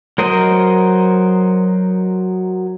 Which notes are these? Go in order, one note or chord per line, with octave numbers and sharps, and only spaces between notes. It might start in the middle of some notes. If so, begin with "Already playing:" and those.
F#3 A#4 C5 D#5